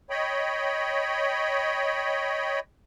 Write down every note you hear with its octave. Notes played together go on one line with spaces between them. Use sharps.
C#5 D#5 G5 B5